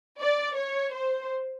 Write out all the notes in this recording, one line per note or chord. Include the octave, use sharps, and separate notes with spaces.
D5
C#5
C5